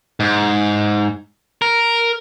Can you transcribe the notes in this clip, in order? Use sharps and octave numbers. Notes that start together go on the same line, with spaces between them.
G#2
A#4